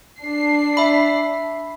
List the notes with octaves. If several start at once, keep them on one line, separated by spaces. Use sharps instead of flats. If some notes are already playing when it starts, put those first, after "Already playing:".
D4 C7
E5 B5